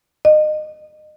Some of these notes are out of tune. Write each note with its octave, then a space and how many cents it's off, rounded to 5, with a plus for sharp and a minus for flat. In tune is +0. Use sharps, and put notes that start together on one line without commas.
D#5 -30